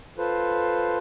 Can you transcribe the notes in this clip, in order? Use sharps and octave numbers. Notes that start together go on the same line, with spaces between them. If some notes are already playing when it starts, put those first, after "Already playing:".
F4 A4 B4 C5